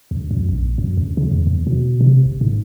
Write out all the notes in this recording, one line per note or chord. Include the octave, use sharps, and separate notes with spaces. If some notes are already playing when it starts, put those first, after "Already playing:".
D2
F#2
A#1
F#2
D2
C#3
E2
E2
B2
C3
G1
G#2